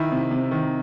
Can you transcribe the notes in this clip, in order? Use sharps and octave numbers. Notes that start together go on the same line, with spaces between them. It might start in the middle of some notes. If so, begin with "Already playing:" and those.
Already playing: D#3 E4
C3
C3
D#3